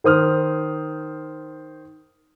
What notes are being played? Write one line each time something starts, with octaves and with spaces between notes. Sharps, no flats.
D#3 C5 D#6 F6